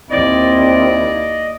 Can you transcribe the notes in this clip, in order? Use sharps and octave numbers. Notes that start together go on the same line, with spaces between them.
D#2 C4 E4 D5 D#5
D5